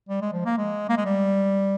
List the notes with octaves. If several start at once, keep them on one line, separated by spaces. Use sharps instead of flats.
G3
G#3
F3
A#3
G#3
A#3
G#3
G3